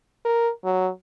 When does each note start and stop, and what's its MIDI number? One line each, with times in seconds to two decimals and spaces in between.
0.25 0.50 70
0.64 0.89 54